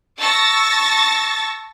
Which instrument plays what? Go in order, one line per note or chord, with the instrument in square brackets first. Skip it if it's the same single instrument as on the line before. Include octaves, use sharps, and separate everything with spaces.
[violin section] A5 C#6 E6 A6 A#6